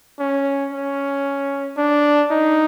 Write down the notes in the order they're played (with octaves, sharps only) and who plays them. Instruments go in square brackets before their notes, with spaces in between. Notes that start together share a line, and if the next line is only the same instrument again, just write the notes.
[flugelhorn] C#4
C#4
D4
D#4